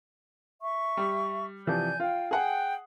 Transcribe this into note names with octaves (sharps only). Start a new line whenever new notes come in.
E5 C#6
G3
C3 E3 F3 D5 G#5 G6
F4 F5 G5
G#4 F#5 G5